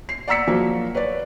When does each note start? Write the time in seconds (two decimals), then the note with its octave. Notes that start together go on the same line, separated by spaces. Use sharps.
0.09 C7
0.28 D5 F#5 A#5 E6 B6 C#7
0.47 F3 F#3 A#3
0.95 B4 C#5 D5